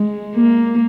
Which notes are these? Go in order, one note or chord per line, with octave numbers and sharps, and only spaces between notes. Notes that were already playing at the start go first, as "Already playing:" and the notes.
Already playing: G#3
A#3